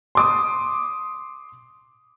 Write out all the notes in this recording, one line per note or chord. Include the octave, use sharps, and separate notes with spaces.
C6 D6 D#6